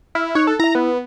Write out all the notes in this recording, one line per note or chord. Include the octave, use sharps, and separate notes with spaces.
E4 F6
D#4 C#5 F#6
A4
E4 E5 A#5
B3